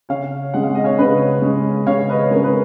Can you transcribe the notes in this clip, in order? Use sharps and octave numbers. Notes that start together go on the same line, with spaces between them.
C#3 C#5 F5
G#3 C#4 F#5
F5
D#5
C#5 F5
C#3 B4 D#5
G#3 C#4
C#3 C#5 F5
B4 D#5
G#3 C#4 A#4 C#5
B4